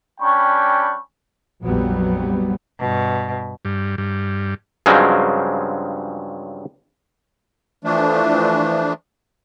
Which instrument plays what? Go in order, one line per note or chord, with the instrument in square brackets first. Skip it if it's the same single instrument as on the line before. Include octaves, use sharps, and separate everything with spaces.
[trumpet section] G3 C#4 D4 G5 B5 C#6
[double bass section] A#1 F2 F#3 G3 B3
[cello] G2 B2
[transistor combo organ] G2
G2
[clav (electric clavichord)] G2 C#3 F3 F#3 G#3 C4
[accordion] E3 F3 A3 D4